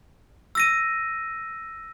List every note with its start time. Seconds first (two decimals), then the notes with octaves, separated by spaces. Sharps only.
0.55 E6 A#6 D#7